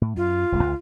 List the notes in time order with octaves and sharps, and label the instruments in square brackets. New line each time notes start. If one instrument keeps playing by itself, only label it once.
[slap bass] A2
[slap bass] F#2 [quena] F4
[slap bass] D#1 C2 G#3
C#2